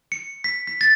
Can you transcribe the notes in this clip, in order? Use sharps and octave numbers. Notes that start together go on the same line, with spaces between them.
C#7
B6
B6
A6